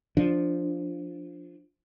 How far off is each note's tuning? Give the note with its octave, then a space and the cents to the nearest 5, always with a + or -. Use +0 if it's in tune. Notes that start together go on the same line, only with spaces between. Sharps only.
F3 +0 D4 +0